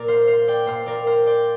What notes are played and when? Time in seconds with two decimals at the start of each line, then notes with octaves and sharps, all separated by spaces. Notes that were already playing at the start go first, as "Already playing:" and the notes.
Already playing: A#2 A#3 A#4 D5
0.08 C5 F5
0.27 C5 F5
0.48 D5 G5
0.66 A#2 A#3 C5 F5
0.86 A#4 D5
1.07 C5 F5
1.26 D5 G5